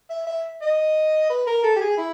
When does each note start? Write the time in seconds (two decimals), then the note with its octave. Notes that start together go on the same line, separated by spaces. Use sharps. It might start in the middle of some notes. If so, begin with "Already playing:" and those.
0.10 E5
0.27 E5
0.62 D#5
1.30 B4
1.47 A#4
1.63 A4
1.76 G4
1.81 G#4
1.98 E4